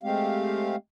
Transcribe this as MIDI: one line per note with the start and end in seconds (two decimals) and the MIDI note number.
0.03 0.76 56
0.03 0.76 57
0.03 0.76 60
0.03 0.76 67
0.03 0.76 77